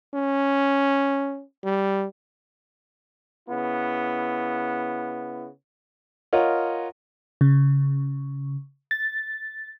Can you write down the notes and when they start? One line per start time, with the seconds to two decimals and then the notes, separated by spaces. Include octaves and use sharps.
0.14 C#4
1.64 G3
3.49 C#3 B3 E4
6.33 F4 A#4 C#5 D#5 F#5
7.41 C#3
8.91 A6